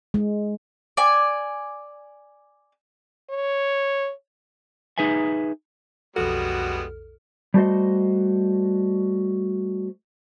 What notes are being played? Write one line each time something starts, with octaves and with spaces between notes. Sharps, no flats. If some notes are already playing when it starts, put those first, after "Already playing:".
G#3
D5 G#5
C#5
D#4 G#4 B4 E5 G#5
B1 F2 G3 G#3 B3 F#4 A4 F6
G3 A3 F#4 C5 D#5